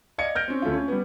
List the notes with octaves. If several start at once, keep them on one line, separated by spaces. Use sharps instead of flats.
D5 D#5 F5 G#6 C#7
F6 G6 A#6 D7
C4 C#4
D2 A3 C#4 F4
C#4
G3 B3